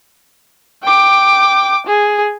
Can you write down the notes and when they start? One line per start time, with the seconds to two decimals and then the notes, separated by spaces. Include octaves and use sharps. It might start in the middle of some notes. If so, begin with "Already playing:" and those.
0.83 G5 D6
1.86 G#4